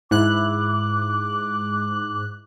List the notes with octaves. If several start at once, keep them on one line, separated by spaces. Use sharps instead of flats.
G#2 E4 D6 F#6